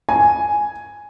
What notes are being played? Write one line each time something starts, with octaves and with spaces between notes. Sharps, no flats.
G#5